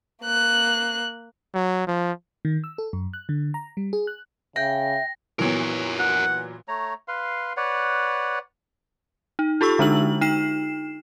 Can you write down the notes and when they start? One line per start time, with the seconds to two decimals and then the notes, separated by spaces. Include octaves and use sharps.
0.23 A#3 F#6
1.54 F#3
1.87 F3
2.45 D#3
2.64 E6
2.78 A4
2.93 F#2
3.13 F#6
3.29 D3
3.54 A#5
3.77 G3
3.93 G#4
4.07 F#6
4.56 C#3 E5 G5 A#6
5.39 A#2 E3 F#3 B3 E4 A#4 C#5
5.99 F#5
6.68 A3 C#5 A#5
7.08 B4 F5 C6
7.57 B4 C#5 D5 F#5
9.39 D#4
9.61 F4 G4 A4 C#6 E6
9.79 D3 G#3 D4 D#4 F#7
10.21 D#4 C7 E7